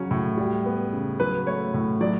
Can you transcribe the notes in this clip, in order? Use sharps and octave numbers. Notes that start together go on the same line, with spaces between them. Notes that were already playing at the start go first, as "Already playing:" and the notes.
Already playing: C#3 F#3 C#4
A2
G3
B3
C#3
F#3 B4
A3 C#5
A2
F#3 D5